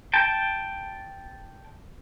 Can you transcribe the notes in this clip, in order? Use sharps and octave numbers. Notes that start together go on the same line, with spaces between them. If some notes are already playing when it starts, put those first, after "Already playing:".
G5 A5